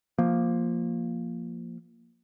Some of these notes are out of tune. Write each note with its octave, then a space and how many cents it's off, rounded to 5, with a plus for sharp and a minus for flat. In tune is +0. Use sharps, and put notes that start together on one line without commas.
F3 +0 A#3 +0